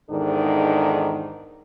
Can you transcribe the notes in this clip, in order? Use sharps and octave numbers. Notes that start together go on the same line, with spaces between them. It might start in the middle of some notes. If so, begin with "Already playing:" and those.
E2 G#2 D#3 D4 D#4 A4